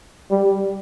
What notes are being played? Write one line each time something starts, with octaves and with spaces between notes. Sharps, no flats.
G3